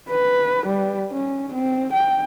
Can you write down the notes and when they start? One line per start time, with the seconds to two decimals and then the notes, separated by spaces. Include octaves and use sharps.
0.11 B4
0.67 G3
1.12 C#4
1.54 C4
1.93 G5